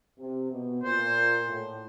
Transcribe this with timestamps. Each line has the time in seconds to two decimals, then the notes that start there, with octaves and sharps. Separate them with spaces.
0.19 C3
0.51 B2
0.83 A#2 C5
1.47 A2